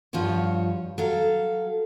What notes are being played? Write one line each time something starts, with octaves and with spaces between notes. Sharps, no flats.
G2 F3 F4 F#4 C#5
F#3 A4 F5